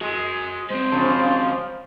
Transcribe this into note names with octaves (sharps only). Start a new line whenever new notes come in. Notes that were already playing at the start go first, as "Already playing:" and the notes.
G#3 F#4 G#5
G#3 C4 C5
F#2 C#3 F3